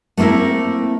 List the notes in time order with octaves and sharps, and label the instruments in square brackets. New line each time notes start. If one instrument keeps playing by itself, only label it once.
[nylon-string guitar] A3 A#3 C4 E4 A#4